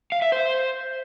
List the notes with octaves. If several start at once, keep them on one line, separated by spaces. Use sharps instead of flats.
F5
E5
C5